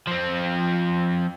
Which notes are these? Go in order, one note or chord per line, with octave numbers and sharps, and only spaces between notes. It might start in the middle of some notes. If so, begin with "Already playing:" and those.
F3 C4